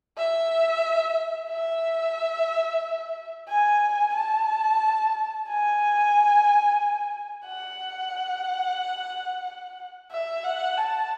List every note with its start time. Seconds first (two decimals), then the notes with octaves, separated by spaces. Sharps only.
0.17 E5
1.50 E5
3.49 G#5
4.15 A5
5.48 G#5
7.46 F#5
10.11 E5
10.44 F#5
10.77 A5